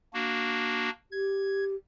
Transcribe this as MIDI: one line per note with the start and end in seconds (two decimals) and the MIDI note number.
0.14 0.90 58
0.14 0.90 62
0.14 0.90 66
1.12 1.75 67
1.12 1.64 92